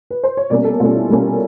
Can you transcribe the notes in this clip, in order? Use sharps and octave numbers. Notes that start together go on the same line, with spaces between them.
B4
C5
C#5
B2 G3 A#3 C#4 D5
A4
B2 G3 A#3 C#4 F4
E4
B2 G3 A#3 C#4